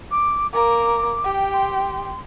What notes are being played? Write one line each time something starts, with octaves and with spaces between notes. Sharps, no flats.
D6
A#3 A#4 D6
G4 G5
C6